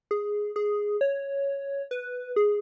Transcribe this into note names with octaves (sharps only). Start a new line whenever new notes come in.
G#4
G#4
C#5
B4
G#4